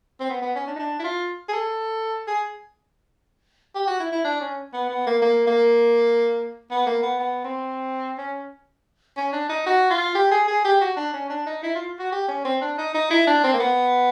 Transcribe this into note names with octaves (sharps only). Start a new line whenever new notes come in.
C4
B3
B3
C#4
D4
D#4
D4
E4
F4
G#4
A4
G#4
G4
F#4
E4
E4
D4
C#4
B3
B3
A#3
A#3
A#3
B3
A#3
B3
B3
C4
C#4
C#4
D4
D#4
F#4
F4
G4
G#4
G#4
G4
F#4
D4
C#4
D4
D#4
E4
F4
F#4
G4
C#4
C4
D4
D#4
D#4
E4
D4
C4
A#3
B3